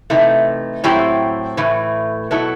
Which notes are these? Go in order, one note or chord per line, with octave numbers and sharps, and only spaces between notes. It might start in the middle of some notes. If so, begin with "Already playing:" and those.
C3 E3 A3 D#4
A2 F#3 C4 E4 G4
A2 E3 A3
B2 F#3 B3 E4 A4